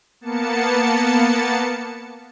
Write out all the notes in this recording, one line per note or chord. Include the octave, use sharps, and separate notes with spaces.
A#3 B3 A5 C#7